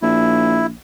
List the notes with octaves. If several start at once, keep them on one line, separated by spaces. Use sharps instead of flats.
A#1 E4